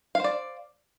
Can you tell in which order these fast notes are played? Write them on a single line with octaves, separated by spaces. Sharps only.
F5 C5 D5